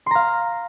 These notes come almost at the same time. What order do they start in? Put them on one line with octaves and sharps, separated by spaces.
C6 A#5 F5